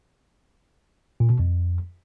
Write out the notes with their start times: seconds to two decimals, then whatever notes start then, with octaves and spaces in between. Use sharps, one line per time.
1.20 A#2
1.30 B2
1.39 F2